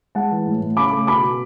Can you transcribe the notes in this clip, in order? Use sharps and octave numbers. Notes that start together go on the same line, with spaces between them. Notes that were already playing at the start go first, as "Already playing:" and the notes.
G#3 F#5 A5
E3
A2
A2
C#3 B5 D6
A3
B2 B5 D6
B2